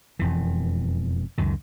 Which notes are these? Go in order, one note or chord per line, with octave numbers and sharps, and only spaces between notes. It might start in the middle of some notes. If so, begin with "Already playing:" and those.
E1 F2 E3
C#2 F#2 D#3